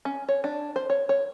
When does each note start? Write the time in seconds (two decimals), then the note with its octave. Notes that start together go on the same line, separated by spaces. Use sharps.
0.05 C#4
0.29 C#5
0.44 D4
0.76 C5
0.90 C#5
1.09 C#5